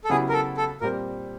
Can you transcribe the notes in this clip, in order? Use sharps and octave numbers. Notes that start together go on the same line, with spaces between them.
A4
C#3 F#3 B3 E4 G4 G#4
A#4
A4
A4
A#2 G3 C4 A#4